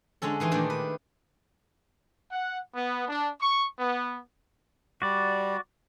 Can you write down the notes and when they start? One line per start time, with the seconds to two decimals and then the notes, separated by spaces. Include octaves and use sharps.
0.22 D3 G#3 C#4 A4
0.40 D#3 E3 D#4 C6
0.51 A#2 D#3 A3 D4 G4 A#4
0.70 B4
2.31 F#5
2.74 B3
3.08 D4
3.41 C#6
3.79 B3
5.02 G3 F#4 D5